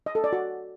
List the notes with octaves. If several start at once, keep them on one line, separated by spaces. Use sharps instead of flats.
D#5
A4
D5
F#4